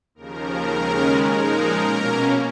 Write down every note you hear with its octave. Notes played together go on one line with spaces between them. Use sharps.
D#2 C#3 F3 A#4
D#2 C#3 G#3 C#4
A#2 F3 G#3 D#4 A#4
B2 A#3 C#4